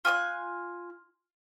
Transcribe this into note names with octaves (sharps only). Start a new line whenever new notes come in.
F4 G#5 D#6 F#6